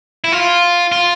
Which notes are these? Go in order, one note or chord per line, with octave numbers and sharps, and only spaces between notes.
E4
F4
F4